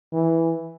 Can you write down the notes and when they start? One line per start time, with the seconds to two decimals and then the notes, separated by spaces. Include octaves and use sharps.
0.13 E3